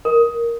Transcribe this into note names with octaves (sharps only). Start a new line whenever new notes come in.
A#4